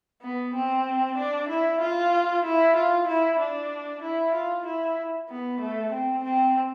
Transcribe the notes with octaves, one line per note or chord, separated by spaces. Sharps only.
B3
C4
D4
E4
F4
E4
F4
E4
D4
E4
F4
E4
B3
A3
C4
C4